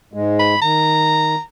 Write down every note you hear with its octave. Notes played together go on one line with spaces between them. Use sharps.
G#2 G#3
B5
D#3 A#5